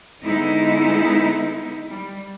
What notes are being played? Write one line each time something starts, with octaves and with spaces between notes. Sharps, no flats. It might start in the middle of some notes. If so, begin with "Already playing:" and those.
D3 G#3 B3 D#4 E4
G3